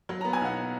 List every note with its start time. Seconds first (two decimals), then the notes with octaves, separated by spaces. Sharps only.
0.09 F#3
0.21 B3 A#5
0.33 G#5
0.41 B1 F#5